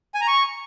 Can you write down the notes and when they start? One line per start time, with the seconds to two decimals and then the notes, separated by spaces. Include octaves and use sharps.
0.14 G#5
0.21 A#5
0.28 C#6